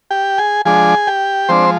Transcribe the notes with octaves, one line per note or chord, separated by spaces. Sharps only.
G4 G5
G#4 G#5
F3 G#3 D4 G#4 G#5
G4 G5
F3 G#3 C4 D4 C5